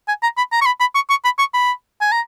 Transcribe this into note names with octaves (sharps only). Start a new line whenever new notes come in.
G#5
A#5
B5
A#5
C#6
B5
B5
C#6
C#6
B5
C#6
B5
G#5
A#5